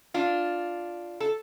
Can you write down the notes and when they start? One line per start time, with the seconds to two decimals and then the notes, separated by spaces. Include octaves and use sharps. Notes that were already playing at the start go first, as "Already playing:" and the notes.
0.14 D4 F4
1.20 A4